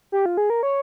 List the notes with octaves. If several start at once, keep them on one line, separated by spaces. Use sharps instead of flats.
G4
F4
G#4
A#4
C#5